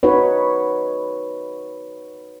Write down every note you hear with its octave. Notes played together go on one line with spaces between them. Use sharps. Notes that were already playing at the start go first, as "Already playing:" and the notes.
D#4 F#4 B4 C#5